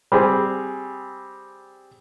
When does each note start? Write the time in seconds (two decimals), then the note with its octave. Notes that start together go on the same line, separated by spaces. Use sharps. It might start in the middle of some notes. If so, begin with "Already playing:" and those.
0.12 G3 C4 G#4